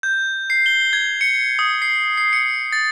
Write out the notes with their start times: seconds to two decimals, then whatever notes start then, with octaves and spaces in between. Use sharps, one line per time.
0.03 G6
0.50 C7
0.66 G7
0.93 G#6
1.21 C#7
1.59 D#6
1.82 C7
2.17 C7
2.33 C#7
2.73 A6